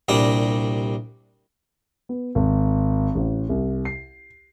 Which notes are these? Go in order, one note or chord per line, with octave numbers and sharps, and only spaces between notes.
C2 A#2 G3 D4 A#5
B3
G#1
A1
C2
C7